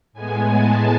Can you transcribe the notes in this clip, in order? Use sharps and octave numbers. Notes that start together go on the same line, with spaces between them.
A2 G#3 B3 G#5
A5